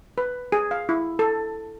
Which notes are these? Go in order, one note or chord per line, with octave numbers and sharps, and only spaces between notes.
B4
G#4
F5
E4
A4